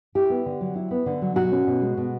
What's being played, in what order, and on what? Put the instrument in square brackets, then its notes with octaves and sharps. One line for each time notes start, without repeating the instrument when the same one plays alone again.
[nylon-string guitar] E4 G4
B3
D3
F#3
E4
B3
D3
F#3
B2 F#4
C#4
B2
G#3
B2